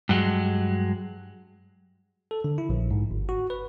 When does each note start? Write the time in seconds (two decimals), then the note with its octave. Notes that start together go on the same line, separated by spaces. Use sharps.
0.09 G2 F#3 G#3
2.31 A4
2.44 D3
2.58 E4
2.69 A#1
2.91 G#2
3.11 G1
3.29 F#4
3.50 B4